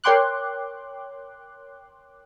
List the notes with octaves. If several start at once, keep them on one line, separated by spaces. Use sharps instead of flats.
A#4 C#5 G5 C6 D6 F#6